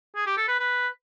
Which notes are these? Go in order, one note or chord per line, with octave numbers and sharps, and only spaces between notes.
G#4
G4
A4
B4
B4